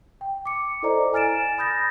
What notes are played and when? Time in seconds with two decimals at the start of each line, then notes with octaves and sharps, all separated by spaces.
0.21 G5
0.46 D6 C#7
0.83 E4 A4 C5 D5 D#5 A#5
1.13 G#5 F6 A6 D7 E7
1.58 B5 D#6 G6 A6 A#6